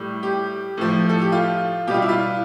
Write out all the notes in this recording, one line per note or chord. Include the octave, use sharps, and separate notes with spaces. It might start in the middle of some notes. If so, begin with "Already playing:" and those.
Already playing: A2 G3
G4
A2 F3
A4
G4
F4
B2 G3 F4 G4
E4
F4